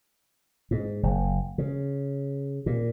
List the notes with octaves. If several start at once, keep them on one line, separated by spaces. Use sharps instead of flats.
G#2
F#1
C#3
A#2